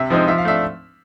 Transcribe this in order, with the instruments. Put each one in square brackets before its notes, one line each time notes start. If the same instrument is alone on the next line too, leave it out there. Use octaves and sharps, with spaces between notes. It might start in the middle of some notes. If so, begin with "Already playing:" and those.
Already playing: [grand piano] C3 E5
F3 G#3 C4 D#4
F3 E5
F5
A3 D4 E5